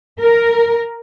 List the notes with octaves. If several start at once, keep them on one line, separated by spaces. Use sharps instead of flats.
A#4